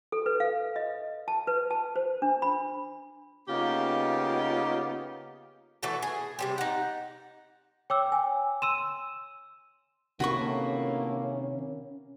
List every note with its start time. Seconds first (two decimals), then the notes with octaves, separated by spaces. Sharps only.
0.12 A4
0.26 B4
0.40 F5
0.76 D#5
1.28 A5
1.47 B4
1.71 A5
1.96 C5
2.22 D4
2.42 B5
3.48 C#3 A#3 B3 D#4 F4 G4
5.83 E3 A3 F#4 A4
6.02 G#4
6.39 C3 G3 C4
6.58 D#4 F#5
7.90 C#5 G5 D6 E6
8.12 G#5
8.62 C6 E6 D#7 E7
10.20 A2 C3 D#3 A#3 C#4 F#4 B4 C#6